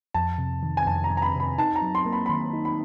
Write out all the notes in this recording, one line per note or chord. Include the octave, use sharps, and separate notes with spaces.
F2 A5
C3
D#3
G#5
F2 A5
A#5
F2
A#5
B5
C3 B5
D#4 A5
A#5
F#3
C6
A#3
B5
B5
D#3 C6
D#4
B5